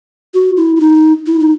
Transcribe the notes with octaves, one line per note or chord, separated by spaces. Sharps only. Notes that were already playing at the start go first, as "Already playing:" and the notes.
F#4
E4
E4
D#4
E4
D#4